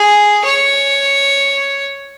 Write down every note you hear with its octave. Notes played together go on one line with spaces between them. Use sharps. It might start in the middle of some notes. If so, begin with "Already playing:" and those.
Already playing: G#4
C#5